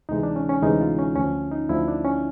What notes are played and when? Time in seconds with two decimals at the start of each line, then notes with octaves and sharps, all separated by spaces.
0.09 D2 C3 E3 G#3 D#4
0.23 D4
0.36 C#4
0.49 C#4
0.62 D2 C3 E3 G#3 D#4
0.81 F4
0.98 C#4
1.16 D2 D3 F3 C#4
1.52 D#4
1.69 D2 D3 F3 E4
1.88 D4
2.05 C#4